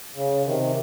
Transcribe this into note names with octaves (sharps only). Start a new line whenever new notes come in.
C#3
C3 D#3